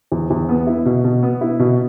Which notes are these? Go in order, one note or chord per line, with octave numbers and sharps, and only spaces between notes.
E2
E2
B3
E4
B2
B2
B3
E4
B2